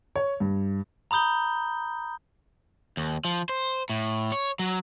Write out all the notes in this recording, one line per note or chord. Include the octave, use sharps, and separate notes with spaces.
C#5
G2
A#5 B5 D#6 G6 G7
D#2
F3
C5
A2
C#5
F#3